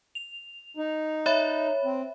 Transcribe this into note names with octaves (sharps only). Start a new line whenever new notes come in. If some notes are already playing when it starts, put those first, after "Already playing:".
F7
D#4
C#5 E5 B5
C4